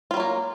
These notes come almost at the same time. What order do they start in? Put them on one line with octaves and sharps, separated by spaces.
F4 G3 F#3 A#3